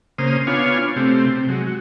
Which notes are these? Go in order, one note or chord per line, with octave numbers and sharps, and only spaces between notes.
C#3 A#3 C5 D#6 F6
B3 D4 F4 C#5 F5 G#5
C3 A3 C4 G4
C3
F#3 G#3
F#4